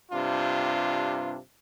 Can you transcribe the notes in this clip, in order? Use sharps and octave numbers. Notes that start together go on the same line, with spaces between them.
G2 C3 D4 F4